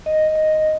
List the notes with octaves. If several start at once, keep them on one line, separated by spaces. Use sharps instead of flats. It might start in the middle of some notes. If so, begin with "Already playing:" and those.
D#5
D#5